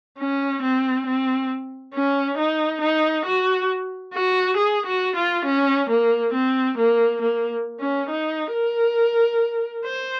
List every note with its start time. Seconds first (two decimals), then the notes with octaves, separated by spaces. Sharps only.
0.19 C#4
0.62 C4
1.06 C4
1.94 C#4
2.38 D#4
2.81 D#4
3.26 F#4
4.13 F#4
4.57 G#4
4.86 F#4
5.16 F4
5.45 C#4
5.90 A#3
6.33 C4
6.78 A#3
7.22 A#3
7.80 C#4
8.09 D#4
8.53 A#4
9.85 C5